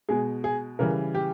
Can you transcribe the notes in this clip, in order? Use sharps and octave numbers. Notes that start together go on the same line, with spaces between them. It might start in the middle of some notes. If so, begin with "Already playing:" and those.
B2 G#3 G#4
G#4
C#3 E3 G3 A#4
G4